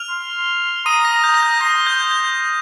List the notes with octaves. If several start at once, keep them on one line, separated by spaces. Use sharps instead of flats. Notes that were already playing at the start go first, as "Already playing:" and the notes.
Already playing: F6 F7
C6
A#5 D#6 D#7
A#6
A#5 G6
A#6
G6
C6 A#6
G6
G6